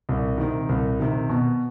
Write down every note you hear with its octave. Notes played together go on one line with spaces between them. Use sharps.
C2
C3 D#3
C2
C3 D#3
B2